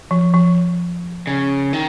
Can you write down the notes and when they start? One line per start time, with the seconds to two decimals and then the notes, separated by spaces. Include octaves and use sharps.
0.11 F3
0.34 F3
1.27 C#3
1.73 D#3